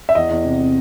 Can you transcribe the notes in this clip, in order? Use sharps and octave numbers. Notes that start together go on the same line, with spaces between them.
E5
E2 D#5
E2
C3
C3